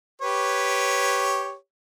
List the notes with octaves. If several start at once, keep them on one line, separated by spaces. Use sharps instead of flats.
G4 B4 C#5